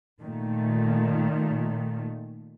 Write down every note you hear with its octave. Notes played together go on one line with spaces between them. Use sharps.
A#2 D#3 A3